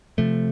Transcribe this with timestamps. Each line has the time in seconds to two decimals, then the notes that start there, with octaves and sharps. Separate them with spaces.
0.18 C3 F3 A3